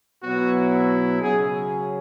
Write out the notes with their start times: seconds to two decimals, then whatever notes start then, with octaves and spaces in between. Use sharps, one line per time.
0.22 B2 F#3 B3 E4 F#4
1.21 C#3 F#3 C#4 G#4